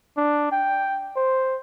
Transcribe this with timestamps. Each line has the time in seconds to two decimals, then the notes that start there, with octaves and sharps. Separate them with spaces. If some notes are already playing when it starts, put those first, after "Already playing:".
0.17 D4
0.52 G5
1.16 C5